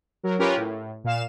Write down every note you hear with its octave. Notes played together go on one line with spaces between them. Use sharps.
F#3 A#4
C#4 F4 G4 A#4 B4 C#5
A2
A#2 F5 E7